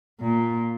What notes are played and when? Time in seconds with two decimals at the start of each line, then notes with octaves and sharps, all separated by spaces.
0.20 A#2